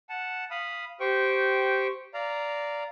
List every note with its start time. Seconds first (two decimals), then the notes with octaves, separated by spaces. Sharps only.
0.09 F#5 A5
0.51 F5 B5 D#6
1.00 G4 C5 G5 C#6
2.14 D5 F5 A#5